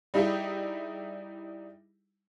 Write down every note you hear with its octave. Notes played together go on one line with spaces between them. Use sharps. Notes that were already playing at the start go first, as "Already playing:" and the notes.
G3 D#4 E4 G4 G#4 G5